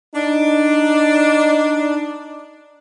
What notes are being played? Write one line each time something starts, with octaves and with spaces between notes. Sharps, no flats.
D4 D#4